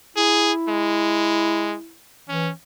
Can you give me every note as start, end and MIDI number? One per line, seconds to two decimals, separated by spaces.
0.17 1.95 64
0.17 0.52 68
0.69 1.75 56
2.29 2.51 52
2.29 2.50 61